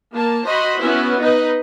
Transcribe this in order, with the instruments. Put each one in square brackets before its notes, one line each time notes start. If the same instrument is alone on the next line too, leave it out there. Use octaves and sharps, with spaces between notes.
[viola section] A#3 A5
F#4 C5 D#5 B5 C6
B3 C#4 E4 F#4
D#4 B4 D#5